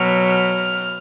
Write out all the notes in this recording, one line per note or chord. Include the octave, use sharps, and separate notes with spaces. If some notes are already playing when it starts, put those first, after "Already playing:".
Already playing: B2 F#3 F6
F6